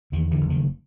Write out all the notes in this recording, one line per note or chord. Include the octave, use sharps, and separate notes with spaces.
E2 D#3
D3 E3
F#1
D#3